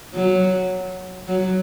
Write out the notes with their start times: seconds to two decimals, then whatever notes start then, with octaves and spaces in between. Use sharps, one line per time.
0.14 F#3
1.28 F#3